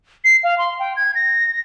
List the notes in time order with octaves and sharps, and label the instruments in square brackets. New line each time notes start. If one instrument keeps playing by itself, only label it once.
[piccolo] C7
F5
C6
G5
G#6
A#6